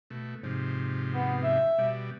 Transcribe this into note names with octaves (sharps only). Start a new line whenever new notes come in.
B2 A3
G#2 C3 F3
B3
E5
B2 G3